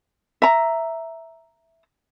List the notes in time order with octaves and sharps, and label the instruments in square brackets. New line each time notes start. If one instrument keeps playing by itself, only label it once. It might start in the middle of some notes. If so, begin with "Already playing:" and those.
[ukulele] E5 A#5